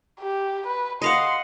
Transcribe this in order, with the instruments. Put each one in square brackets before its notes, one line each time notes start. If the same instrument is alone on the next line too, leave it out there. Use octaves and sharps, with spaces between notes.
[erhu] G4
B4
[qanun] D#5 F5 F#5 [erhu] C6